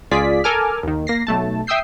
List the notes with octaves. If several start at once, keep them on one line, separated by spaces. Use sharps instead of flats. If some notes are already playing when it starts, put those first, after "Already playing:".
C#2 F4 G#4 D5 B6
A4 A#4 G#5 D6 F6
D#2 D#3
A#3 A#6 C7
B1 A3 A5
E5 G5 D#6 E6 G6 C7